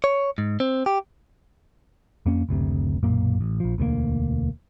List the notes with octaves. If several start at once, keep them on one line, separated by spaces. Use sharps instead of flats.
C#5
G#2
C4
G4
F2 A#3 C#4
F#1 D2 C3
B1 F#2 A#2 A#3
A1
A#1 F3
E1 D2 C#3 A#3